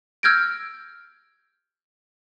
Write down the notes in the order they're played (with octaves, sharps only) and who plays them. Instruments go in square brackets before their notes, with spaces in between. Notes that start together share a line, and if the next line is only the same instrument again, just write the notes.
[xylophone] E6 F6 G6 G#6 A#6 D7